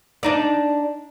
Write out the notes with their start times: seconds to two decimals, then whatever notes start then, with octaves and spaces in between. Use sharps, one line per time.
0.23 D4 D#4 D5